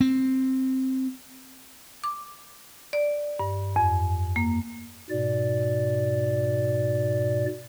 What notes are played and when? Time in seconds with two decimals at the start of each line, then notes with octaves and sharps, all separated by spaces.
0.01 C4
2.04 D6
2.93 D5
3.39 G2
3.76 F2
4.36 A#3
5.10 G#2 B2 D5